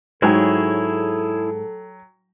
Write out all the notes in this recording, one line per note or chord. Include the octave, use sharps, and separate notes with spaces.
G#2 F#3 E4 G#4 A4 C#5 G5